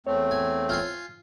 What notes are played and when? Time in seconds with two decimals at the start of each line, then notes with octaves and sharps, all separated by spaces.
0.07 E2 A3 C4 C#5
0.31 G#5
0.69 F4 G#5 C6